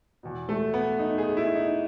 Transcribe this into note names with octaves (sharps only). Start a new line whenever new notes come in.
E2 B2
A3
B3
D#4
G#4
E4
D#4